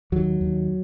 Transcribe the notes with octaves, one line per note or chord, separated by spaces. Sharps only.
D#2 F#3
D#2